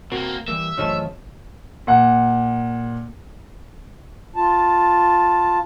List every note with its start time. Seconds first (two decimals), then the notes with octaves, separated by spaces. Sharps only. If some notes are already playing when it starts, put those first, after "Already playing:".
0.12 B2 A#3 C4 F#4 A#4
0.48 E3 G3 A#3 E5
0.77 F#2 C#3 E3 F3 A3 D#5
1.87 A#2 F#5 C#7
4.36 F4 A5